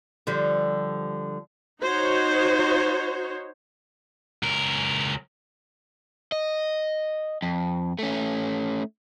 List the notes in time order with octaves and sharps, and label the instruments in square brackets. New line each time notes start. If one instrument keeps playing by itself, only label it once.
[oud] D3 F3 G3
[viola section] D#4 F#4 C5 C#5
[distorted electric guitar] C#2 A#4
[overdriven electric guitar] D#5
F2
A3 C#4